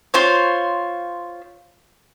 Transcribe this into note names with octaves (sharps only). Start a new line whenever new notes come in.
F4 C5 C#5